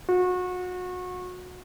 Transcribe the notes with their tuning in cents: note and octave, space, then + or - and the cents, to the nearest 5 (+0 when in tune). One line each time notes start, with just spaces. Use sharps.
F#4 -30